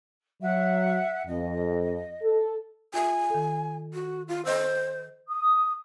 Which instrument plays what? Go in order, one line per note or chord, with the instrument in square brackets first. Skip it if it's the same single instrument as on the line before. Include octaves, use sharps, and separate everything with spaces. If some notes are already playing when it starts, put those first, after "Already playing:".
[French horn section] F#3 [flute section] E5 F#5
[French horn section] F2 [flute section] D#5
[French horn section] A4
[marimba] F4 E5 [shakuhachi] G#5
[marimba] D#3 A4
[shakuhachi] F#4
F4
[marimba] A4 D#5 E6 [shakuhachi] C5
[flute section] D#6